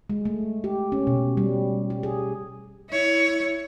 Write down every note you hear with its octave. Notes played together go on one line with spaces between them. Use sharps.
G#3
A3
G4
C#4
B2
G3
G4
G#4
E4 C#5